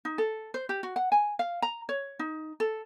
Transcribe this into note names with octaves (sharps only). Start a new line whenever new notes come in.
D#4
A4
C5
G4
F#4
F#5
G#5
F5
A#5
C#5
D#4
A4